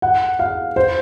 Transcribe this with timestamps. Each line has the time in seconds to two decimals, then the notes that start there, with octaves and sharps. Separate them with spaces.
0.02 F#5
0.39 F5
0.76 C5